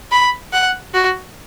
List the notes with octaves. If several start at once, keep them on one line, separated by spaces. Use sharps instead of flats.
B5
F#5
F#4